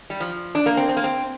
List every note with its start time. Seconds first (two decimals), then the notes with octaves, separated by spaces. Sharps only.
0.10 G3
0.20 F3
0.55 D4
0.66 A#3
0.77 C4
0.89 C4
0.97 A#3
1.04 C4